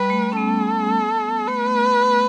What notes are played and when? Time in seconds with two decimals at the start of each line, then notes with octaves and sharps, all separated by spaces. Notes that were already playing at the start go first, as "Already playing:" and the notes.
Already playing: G3 B4
0.10 A3
0.32 C#4
0.37 B3 A4
1.48 A3 B4